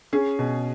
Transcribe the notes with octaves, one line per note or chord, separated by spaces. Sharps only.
C#4 G#4
B2